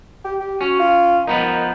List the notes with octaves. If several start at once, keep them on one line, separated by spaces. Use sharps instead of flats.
G4
G4
C#4 F#4
F4
D#3 F3 B3 D#4